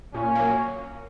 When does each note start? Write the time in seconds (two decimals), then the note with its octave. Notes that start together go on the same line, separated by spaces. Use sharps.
0.14 A#2 C#4
0.35 F#3 A#3